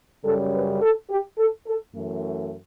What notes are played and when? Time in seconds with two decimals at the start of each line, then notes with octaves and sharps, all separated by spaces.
0.24 F#2 C#3 G3 A4
0.53 B4
0.82 A4
1.10 G4
1.38 A4
1.66 A4
1.95 F#2 E3 A3